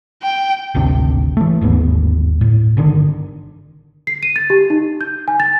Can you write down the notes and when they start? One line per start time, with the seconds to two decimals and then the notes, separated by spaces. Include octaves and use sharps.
0.22 G5
0.75 G#1 D2 C3 D4
1.37 E3 A3
1.61 G1 D#2 G#2 B3
2.41 A2
2.77 G1 D3 D#3 D4
4.07 C7
4.23 D#7
4.36 A6
4.50 G4
4.70 D#4
5.01 G6
5.28 G#5
5.40 A6